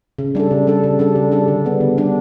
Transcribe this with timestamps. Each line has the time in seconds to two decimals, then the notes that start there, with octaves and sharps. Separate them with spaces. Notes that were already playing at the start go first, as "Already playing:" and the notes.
0.19 C#3
0.35 G3 D4 A4
0.51 C#3
0.67 G3 D4 A4
0.84 C#3
0.99 G3 D4 A4
1.15 C#3
1.32 G3 D4 A4
1.48 D3
1.65 G3 B3 D4
1.81 D3
1.98 G3 B3 D4